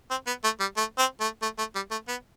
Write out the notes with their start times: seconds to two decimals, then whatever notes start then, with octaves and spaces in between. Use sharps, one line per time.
0.11 C4
0.27 B3
0.44 A3
0.60 G3
0.77 A3
0.98 C4
1.21 A3
1.42 A3
1.59 A3
1.75 G3
1.91 A3
2.08 B3